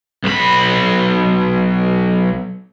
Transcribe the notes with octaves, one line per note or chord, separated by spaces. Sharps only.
B1 B5